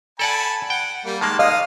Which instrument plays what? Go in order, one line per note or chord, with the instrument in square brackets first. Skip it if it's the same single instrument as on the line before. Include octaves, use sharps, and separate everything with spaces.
[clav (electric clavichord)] A4 D5 F#5 [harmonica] G#5 A5 B5
[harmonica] F#5 [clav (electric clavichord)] G5
[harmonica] G3 A#3
[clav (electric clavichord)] D#3 G#3 A#3 [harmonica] A5
[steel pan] D#5 F5 [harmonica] D#6 F6